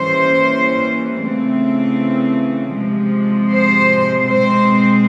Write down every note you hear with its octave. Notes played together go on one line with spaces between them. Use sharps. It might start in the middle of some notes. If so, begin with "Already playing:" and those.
Already playing: E3 G3 A#3 C#4 C5
C#3 E3 A3 C4
C3 F3 G#3
C5
B2 G#3 C4 C5